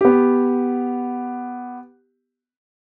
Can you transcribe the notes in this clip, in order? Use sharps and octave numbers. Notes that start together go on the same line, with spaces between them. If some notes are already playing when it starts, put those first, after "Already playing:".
B3 G4